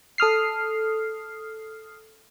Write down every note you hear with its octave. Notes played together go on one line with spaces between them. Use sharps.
A4 D#6 F6 C7